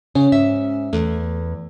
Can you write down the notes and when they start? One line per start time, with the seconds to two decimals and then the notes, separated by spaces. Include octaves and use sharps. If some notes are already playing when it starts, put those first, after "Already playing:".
0.15 C#3 C#4
0.32 G#2 E5
0.93 E2 A3